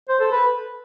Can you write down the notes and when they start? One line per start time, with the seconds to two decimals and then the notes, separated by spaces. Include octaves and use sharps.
0.09 C5
0.20 A4
0.32 B4